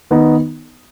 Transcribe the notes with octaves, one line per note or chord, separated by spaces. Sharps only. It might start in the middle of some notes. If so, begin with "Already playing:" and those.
D#3 B3 D#4